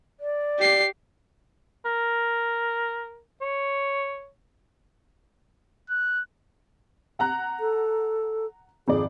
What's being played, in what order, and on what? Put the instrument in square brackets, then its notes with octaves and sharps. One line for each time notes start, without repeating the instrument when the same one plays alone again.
[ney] D5
[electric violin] G4 C7
[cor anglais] A#4
C#5
[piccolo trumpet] F#6
[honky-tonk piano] F#5 A#5 F#6
[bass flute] A4
[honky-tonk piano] G#1 F2 D5 [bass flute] G#4